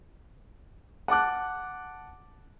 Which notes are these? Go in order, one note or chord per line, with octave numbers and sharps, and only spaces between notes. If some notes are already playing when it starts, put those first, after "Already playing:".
F#5 A5 D6 F#6